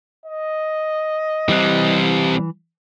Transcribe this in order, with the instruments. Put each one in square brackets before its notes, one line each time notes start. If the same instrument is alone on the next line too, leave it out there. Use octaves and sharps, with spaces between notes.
[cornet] D#5
[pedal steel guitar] E3 F#6 [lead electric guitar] G3 C4